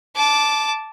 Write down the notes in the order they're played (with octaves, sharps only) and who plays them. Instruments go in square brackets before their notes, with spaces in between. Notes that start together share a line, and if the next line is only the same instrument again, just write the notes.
[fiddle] A5 D6